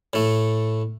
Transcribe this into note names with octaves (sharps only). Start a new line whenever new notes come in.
A2 A3